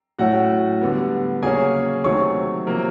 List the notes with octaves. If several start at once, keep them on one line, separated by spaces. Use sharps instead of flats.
A2 F#3 A3 C#4 F#4 F#5
D3 G3 B3
C#3 F#3 A#3 C#4 G#4 G#5
C3 D#3 F#3 A3 C4 C#5 C#6
C3 F3 A#3